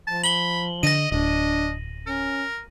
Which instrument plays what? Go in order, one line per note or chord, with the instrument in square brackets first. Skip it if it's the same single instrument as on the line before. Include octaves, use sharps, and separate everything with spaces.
[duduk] F3 [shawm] A5
[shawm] B5 [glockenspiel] F#7 G7
[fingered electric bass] D3 [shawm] D#5 [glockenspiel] A#6 D#7
[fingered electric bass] D1 [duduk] D4 [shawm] D#5
[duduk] C#4 [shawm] A#4